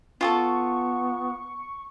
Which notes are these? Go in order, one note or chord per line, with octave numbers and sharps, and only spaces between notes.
B3 F4 G#4 A4 C#6